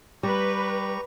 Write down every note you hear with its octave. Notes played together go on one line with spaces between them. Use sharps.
G3 G4 B4 A#5 C#6